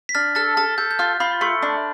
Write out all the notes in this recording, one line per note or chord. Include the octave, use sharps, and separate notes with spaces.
B6
D4 F6 A6
A4 F6 A6
A4 F6 A6
A4 G6
G6
F4 F6
F4 B5
A3 C6
D4